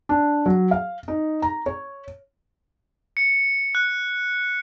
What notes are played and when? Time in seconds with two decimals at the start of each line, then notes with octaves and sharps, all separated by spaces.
0.09 D4
0.46 F#3
0.71 F5
1.08 D#4
1.42 A#5
1.66 C#5
3.17 C#7
3.75 F#6